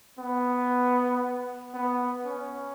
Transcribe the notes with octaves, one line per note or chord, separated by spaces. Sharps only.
B3
B3
C#4